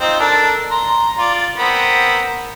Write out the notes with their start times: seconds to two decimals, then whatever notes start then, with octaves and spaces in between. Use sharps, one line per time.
0.01 C4 D#4 F4
0.20 D4 A4 A#4
0.71 A#5 C6
1.19 F4 D5
1.58 B3 C4 A#4